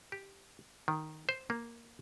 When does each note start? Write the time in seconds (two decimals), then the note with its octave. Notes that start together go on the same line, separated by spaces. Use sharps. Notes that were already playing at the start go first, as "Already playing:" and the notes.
0.12 G4
0.88 D#3
1.29 C5
1.50 A#3